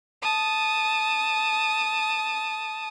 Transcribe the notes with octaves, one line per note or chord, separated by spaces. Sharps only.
A5 D#6